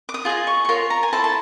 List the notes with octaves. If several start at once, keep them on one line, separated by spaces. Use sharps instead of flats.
D6
D#6
F4 G#4 D#5
C#6
C#6
F4 A#4 C#5 C6
A#5
G#5
E4 A4 C5 A5
A5